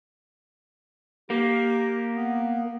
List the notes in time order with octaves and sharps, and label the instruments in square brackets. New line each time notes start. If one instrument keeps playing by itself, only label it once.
[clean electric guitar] A#3 [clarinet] G4
[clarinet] B3